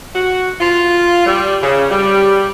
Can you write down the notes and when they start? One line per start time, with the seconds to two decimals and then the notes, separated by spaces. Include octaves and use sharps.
0.15 F#4
0.60 F4
1.26 G3
1.62 C#3
1.91 G3